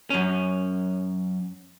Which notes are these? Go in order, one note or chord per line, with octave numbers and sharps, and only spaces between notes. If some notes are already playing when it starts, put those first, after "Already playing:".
F#2 C#4